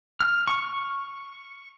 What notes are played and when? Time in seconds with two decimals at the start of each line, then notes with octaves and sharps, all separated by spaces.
0.20 F6
0.47 C#6